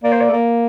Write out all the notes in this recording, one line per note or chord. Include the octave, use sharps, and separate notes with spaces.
A#3 D5
C5
D5
A3
A#3